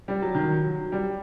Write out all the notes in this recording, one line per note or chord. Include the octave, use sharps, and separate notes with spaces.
G3
F#3
D#3
F#3
G3